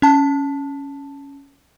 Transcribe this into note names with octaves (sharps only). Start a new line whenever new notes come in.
C#4 A5